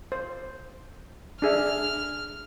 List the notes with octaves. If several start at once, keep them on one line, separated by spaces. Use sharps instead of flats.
C5
D4 G#4 E5 F6